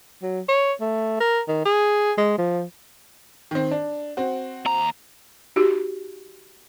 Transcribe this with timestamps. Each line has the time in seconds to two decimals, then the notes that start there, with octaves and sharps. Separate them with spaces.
0.22 F#3
0.49 C#5
0.81 A3
1.21 A#4
1.48 D#3
1.66 G#4
2.18 G#3
2.38 F3
3.51 D#3 C4
3.71 D4
4.17 C4 F#4
4.66 D#2 A#5
5.56 D#4 F#4 G4